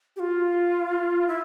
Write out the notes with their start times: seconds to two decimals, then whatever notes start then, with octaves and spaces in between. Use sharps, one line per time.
0.16 G4
0.20 F4
1.28 E4